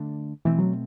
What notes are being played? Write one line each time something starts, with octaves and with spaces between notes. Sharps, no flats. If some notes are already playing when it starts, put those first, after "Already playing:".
Already playing: D3 A3 D4
B2 E3 A3 C4
F#3